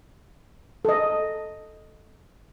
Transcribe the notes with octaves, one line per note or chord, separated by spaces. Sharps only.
A4 D#5